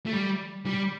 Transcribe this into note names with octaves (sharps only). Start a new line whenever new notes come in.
A3
G3
G3